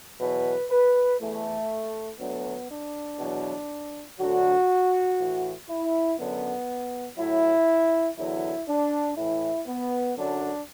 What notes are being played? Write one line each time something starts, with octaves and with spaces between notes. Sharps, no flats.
E2 B2 F#3 B4
B4
E2 E3 A3
D2 D3 F#3 B3
D4
E2 B2 F#3
D2 D3 F#3 F#4
A2 E3
E4
F#2 D3 F#3 B3
A2 F#3 E4
E2 D3 F#3 E4
D4
A2 E3 E4
B3
F#2 D3 F#3 D4